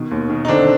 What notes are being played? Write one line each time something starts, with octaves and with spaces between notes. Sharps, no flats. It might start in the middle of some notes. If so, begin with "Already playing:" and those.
Already playing: B2 D#3
D#2
D#3
D#4
D3 C4 D4